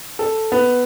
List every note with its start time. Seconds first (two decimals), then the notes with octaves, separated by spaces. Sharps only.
0.19 A4
0.52 B3